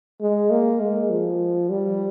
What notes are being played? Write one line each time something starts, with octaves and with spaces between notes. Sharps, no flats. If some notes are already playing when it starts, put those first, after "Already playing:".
G#3
A#3
G#3
F3
G3